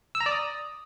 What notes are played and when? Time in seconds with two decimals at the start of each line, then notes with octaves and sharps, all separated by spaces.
0.15 E6
0.21 A#5
0.26 D5
0.32 D#6